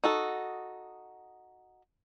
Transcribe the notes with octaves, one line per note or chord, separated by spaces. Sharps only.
D#4 F#4 A4